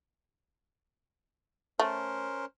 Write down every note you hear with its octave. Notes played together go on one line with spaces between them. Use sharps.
A3 C#4 A#4 C5